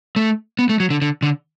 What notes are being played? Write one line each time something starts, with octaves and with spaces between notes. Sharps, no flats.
A3
B3
A3
F#3
D3
D3
D3